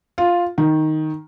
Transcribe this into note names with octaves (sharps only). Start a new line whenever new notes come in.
F4
D#3